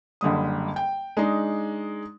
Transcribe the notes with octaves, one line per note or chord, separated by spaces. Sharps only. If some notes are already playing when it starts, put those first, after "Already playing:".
F#1 D3 G3 D#6
G5
G#3 D4 D#4